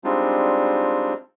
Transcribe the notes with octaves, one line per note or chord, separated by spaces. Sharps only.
G3 G#3 C4 D4 D#4 F4